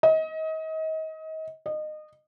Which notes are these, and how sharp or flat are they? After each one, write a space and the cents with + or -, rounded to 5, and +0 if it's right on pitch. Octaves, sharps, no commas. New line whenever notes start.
D#5 +30
D#5 -25